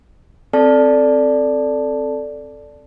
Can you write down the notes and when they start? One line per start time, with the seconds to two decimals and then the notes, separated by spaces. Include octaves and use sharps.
0.53 C4 A4 D5 A5